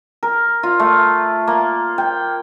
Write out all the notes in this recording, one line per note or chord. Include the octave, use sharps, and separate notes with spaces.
A#4
F4
A3
A#3
G5